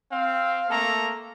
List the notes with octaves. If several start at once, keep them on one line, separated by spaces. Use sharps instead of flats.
C4 F5
A3 A#3 A4 A#5